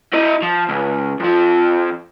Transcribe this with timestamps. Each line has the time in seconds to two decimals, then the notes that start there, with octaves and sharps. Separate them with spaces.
0.13 E4 D#5
0.42 F3
0.69 C#2
1.20 F2 F3